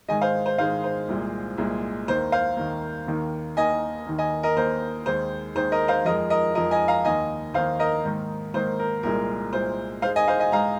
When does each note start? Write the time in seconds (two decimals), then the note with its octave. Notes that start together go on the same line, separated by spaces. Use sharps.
0.08 G#2 D#3 G#3 D#5 G#5
0.21 C5 F5
0.46 C5
0.58 G#2 D#3 G#3 C5 F5
0.84 C5
1.08 C2 A#2 G#3
1.58 C2 A#2 G#3
2.08 D#2 D#3 A#3 C5
2.32 C5 F5
2.57 D#2 D#3 A#3
3.08 D#2 D#3 A#3
3.57 D#2 D#3 A#3 D#5 G#5
4.07 D#2 D#3 A#3
4.18 D#5 G#5
4.43 A#4 D#5
4.56 D#2 D#3 A#3 C5
5.06 D#2 D#3 G#3 C5
5.55 D#2 D#3 G#3 C5
5.72 A#4 D#5
5.88 C5 F5
6.05 F2 F3 G#3 A#4 D#5
6.30 A#4 D#5
6.55 F2 F3 G#3 A#4 D#5
6.71 D#5 G#5
6.88 F5 A#5
7.05 D#2 D#3 A#3 D#5 G#5
7.54 D#2 D#3 A#3 C5 F5
7.79 A#4 D#5
8.05 G#2 D#3 A#3
8.54 G#2 D#3 A#3 C5
8.79 A#4
9.03 C2 A#2 G#3 A#4
9.53 C2 A#2 G#3 C5
10.02 G#2 C5 F5
10.06 G#3
10.16 D#5 G#5
10.28 C5 F5
10.40 D#5 G#5
10.52 G#2 G#3 F5 A#5